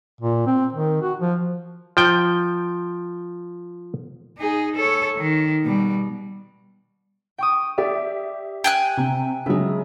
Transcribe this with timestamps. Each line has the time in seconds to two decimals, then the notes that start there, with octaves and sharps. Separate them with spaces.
0.21 A#2
0.47 C4
0.73 D#3
1.02 F#4
1.20 F3
1.97 F3 G5
4.38 D#4 G#4
4.76 A4 C#5
5.17 D#3
5.64 B2 G3
7.38 G5 C#6 D#6
7.78 G4 D5 E5
8.64 G5 G#5 F#6
8.97 C3
9.46 C#3 F#3 G#3 A3